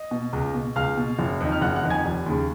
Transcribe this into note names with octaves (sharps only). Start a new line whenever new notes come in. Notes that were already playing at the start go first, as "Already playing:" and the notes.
Already playing: D#5
B2
C#2
B2
C#2 F5 F6
B2
F#1
F2 D#3
F6
F#1 F#5 F#6
F#5 F#6
F2 D#3
G#5 G#6
F1
D#2 C#3